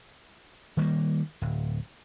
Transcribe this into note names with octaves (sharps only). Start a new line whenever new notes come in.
D#3 G3 A3 A#3
D1